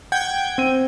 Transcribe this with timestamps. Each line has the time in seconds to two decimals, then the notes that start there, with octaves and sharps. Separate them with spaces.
0.12 F#5 G5 G6 G#6
0.58 C4 D#7